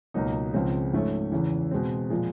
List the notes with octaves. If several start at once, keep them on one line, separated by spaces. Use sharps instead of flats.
C#2 B2 F#3 A#3 D#4
C#2 C#3 F3 G#3 C4
G#2 F3 A3 C#4
E2 C#3 E3
B2 G#3 C4
A#2 F3 G#3